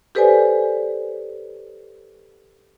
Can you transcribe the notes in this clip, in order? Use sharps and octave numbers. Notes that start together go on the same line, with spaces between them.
G4 A4 B4 C5 D5 G#5